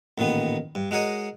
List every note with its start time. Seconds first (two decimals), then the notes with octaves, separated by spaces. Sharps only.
0.18 A1 A#2 D#3 B3
0.75 G2
0.91 G#3 F#4 A#4 C#5 D#5